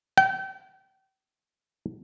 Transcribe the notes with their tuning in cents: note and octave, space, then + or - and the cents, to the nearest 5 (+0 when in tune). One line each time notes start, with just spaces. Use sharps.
G5 -35